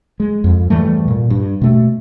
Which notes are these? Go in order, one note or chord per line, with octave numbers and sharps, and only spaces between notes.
G#3
F2
G#2 E3 G3 A3
A#2
G2
B2 A3